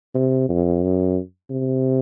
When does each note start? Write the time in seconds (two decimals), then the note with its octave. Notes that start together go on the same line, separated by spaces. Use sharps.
0.15 C3
0.49 F2
0.82 F#2
1.50 C3